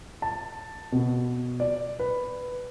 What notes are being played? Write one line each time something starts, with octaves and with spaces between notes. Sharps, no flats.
A5
B2
D5
B4